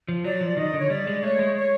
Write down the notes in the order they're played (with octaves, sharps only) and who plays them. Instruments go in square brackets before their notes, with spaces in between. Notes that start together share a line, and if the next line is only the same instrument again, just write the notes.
[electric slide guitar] F3
[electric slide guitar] F#3 [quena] D5
[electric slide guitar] F3
[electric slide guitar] D#3 [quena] D#5
[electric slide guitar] D3
[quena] C#5
[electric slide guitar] G3 [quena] D5
[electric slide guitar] G#3
[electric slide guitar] A3 [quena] C#5
[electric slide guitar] G#3
[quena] C#5